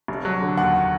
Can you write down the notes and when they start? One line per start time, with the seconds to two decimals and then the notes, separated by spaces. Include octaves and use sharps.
0.08 F1
0.25 F#3
0.41 D3
0.57 D#2 F#5